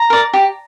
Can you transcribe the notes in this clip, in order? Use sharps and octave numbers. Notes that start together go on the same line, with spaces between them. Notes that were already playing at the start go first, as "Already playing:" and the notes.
Already playing: A#5
A#4 D5
G4